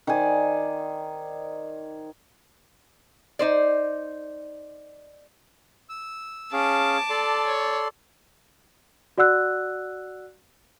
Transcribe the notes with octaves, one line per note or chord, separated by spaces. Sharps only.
D#3 C5 D5 G#5
D#4 C5 D5
E6
C#4 G#4 F5 A5 D6
A4 D5 C6
C#5
F#4 D5 F#5 E6 F#6